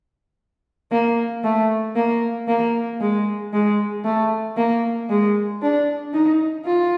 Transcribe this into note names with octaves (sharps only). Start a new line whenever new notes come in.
A#3
A3
A#3
A#3
G#3
G#3
A3
A#3
G#3
D4
D#4
F4